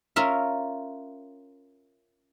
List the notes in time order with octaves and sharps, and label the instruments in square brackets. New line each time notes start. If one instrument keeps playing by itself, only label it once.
[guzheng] C#4 F4 A#4 E5